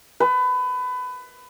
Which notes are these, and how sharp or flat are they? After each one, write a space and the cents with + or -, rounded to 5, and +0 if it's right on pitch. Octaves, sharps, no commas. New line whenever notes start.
B4 +25